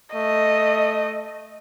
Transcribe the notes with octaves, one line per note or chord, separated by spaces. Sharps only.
A3 D#5